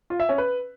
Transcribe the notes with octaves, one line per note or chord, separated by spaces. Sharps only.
F4
E5
C#4
B4